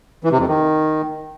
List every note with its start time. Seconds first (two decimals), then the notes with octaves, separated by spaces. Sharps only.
0.24 E3
0.32 C3
0.40 F2
0.47 D#3